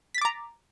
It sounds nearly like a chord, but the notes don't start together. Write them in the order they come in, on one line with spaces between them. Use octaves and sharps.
B6 A6 D6 A#5